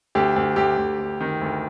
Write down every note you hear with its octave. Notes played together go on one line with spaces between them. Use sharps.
D2 G4
D2
D2 G4
D2
D2
D#3
D2